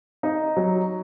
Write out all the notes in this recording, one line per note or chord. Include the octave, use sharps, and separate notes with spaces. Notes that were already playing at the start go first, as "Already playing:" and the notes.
D#4
F#3